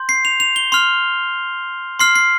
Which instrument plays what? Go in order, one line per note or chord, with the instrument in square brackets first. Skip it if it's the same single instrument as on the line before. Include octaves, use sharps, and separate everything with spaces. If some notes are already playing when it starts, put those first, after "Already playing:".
Already playing: [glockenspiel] C6 G6
C7
F7
F7
G7
C6 F6 F7
C6 F6 C7
C7